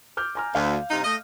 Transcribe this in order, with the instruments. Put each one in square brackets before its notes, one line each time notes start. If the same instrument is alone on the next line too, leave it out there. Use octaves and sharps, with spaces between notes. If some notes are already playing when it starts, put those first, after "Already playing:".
[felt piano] D6 F6 G6
G#5 A#5 F6
[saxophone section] D2 [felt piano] F5
[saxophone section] G2 C3 D#4
A3 D#5